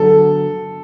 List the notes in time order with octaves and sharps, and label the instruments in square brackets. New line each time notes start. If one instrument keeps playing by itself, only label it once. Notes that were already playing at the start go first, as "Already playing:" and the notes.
Already playing: [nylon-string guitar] D3 F#3 B3 [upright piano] A4